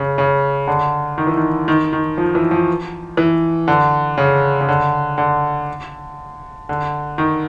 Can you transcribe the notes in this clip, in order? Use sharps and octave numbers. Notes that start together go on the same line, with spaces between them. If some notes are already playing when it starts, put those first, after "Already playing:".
Already playing: C#3
C#3
D3
D#3
E3
D#3
D#3
D#3
F3
E3
F3
E3
D3
C#3
C#3
D3
D3
D3
D#3